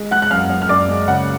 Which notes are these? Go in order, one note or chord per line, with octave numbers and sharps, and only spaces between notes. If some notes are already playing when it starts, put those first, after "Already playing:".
Already playing: G#3
G#3 F#5 F#6
F#6
F#2 F5 F6
F#2
F6
F#2 D5 D6
G#3
C#3 F#5